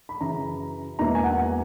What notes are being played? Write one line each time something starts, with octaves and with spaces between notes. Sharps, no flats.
B5
F#2 C#3 E3 A#5
E1 E2 B2 A#3 E4 A#5
G#5
F#5